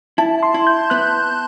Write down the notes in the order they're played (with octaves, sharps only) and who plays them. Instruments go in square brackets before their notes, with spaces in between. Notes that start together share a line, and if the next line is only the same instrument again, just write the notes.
[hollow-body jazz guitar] E4 [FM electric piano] A5
[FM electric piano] C6
[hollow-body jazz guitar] E4
[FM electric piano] G6
[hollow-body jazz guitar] B3 [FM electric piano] F#6